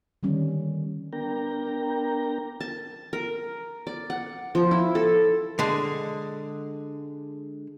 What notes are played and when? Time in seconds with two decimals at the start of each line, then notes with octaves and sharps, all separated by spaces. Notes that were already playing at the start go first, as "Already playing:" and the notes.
0.23 D3 D#3 G3 C#4
1.13 B3 D4 A#4 G5 A#5
2.60 A5
3.13 A#4
3.87 D5
4.10 F#5
4.55 F3
4.71 E4
4.95 A4
5.59 D3 G#3